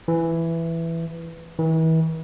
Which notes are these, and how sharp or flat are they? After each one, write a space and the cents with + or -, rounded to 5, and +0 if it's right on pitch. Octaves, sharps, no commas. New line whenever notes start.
E3 +10
E3 -35